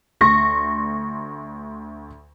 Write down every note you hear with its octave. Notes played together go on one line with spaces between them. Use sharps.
D2 C6 C#6 A#6